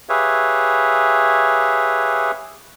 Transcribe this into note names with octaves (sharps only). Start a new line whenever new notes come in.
G4 G#4 B4 C#5 E5 F5